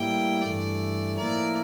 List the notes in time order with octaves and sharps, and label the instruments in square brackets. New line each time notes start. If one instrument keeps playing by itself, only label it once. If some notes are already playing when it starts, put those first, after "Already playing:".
Already playing: [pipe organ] A2 G3 A#3 E4 [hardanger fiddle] G5
[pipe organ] G2 E3 A3 [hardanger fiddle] D5
[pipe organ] A2 F3 A#3 E4 A#4 [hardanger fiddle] D5